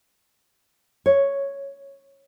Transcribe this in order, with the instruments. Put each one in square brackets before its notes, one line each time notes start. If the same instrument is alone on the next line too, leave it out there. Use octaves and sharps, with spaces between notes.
[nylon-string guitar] C#5